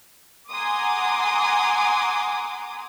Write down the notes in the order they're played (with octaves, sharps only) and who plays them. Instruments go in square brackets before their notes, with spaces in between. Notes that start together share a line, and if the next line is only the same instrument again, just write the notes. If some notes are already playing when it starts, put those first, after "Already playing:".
[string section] F#5 G#5 A#5 C6 D6 D#6